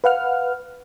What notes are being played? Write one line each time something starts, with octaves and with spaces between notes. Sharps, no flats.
B4 F5 F#5 F6